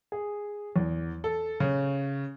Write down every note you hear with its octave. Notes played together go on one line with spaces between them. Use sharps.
G#4
E2
A4
C#3